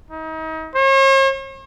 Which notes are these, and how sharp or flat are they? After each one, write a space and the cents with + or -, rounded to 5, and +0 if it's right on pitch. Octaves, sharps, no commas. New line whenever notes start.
D#4 +35
C#5 -45